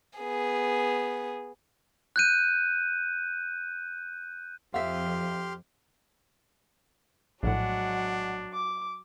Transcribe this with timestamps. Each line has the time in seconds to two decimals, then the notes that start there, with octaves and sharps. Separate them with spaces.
0.19 B3 G#4
2.16 F#6 G6 D#7
4.74 F2 G4 E5 F5 C6 F6
7.43 A#1 A2 F#3 G#3 D4 F#5
8.54 D6